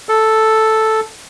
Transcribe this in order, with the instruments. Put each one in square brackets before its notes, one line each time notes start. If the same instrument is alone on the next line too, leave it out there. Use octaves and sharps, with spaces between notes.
[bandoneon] A4